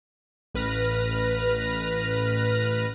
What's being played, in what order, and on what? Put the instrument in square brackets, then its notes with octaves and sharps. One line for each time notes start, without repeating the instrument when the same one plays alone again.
[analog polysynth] A1 B4 F6 A#6